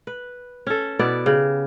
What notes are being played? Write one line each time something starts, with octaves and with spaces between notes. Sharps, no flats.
B4
C#4 A4
B2 B3 E4 D5
C#3 G4